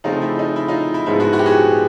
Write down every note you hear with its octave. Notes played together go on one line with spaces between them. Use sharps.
C#3 F3 A3 C4 D#4 F4
E4
D#4
E4
D#4 F4
E4
G#2 F3 G#3 B3 E4
E4 F#4
E4 F#4
G4
F#4 G#4